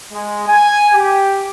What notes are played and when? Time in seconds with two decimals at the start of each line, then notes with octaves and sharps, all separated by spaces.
0.12 G#3
0.47 G#5
0.95 G4